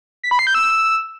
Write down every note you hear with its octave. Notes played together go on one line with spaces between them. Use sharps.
B6
B5
C7
G6
E6